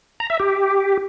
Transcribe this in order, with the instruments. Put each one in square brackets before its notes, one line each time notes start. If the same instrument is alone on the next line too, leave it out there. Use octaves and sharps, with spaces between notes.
[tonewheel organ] A#5
E5
G4